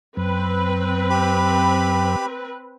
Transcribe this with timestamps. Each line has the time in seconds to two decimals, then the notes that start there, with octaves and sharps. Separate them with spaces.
0.17 F#2 C4 B4
1.10 G4 B5